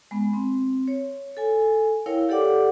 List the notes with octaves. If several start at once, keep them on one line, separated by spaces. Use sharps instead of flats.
G#3 B3
C4
C#5
A4 G#5
E4 A#4 C#5 F5 G5
G4 A4 D5 F#5 D6